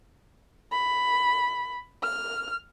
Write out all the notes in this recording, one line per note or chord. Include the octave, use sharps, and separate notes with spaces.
B5
F6